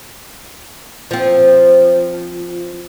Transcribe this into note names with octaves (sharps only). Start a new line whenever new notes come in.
F3 C4